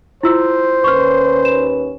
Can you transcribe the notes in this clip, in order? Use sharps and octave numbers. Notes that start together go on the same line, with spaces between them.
E4 F4 C5 E6
D#2 C#4 B4 C#6 F6
E7